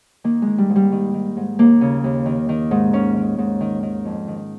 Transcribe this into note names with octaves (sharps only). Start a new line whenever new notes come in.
D#3 A#3
D#3 G#3
G3
G#2
G3
D#3
D#3
G#2
D#2 A#3
C#3
D#2
D#3
D#3
G#2
D#3 C#4
D#3
G#2
D#3
D#3
F2
D#3